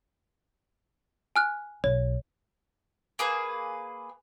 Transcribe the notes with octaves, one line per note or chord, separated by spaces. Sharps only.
G#5 F6 F#6
B1 C#5
A#3 G#4 B4